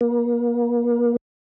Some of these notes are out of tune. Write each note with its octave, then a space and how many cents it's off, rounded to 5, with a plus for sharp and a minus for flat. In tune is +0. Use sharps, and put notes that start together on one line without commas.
A#3 +35